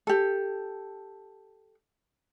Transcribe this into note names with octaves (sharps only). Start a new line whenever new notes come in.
G4 A4